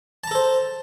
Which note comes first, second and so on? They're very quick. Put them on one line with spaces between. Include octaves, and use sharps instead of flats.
A5 A#5 A4 C5